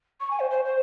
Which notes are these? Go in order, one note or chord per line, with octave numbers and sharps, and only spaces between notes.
C#6
G#5
C5
C5
C5